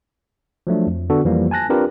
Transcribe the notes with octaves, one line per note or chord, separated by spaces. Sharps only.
F3 F#3 A3 D4
F2
D3 B3 D4 F#4 A4
F2 E3 F3 G3 A#3
G#5 A5 F#6 A#6
C4 D4 F4 G4 A#4 B4